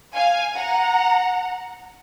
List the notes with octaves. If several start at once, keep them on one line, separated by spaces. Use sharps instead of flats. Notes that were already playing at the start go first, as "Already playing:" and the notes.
F5 G#5
F#5 A#5